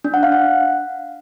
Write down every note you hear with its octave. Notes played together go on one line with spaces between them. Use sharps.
D4
F#5
F5
F#5